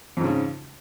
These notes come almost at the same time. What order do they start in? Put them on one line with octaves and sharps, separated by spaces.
F2 G#2 C#3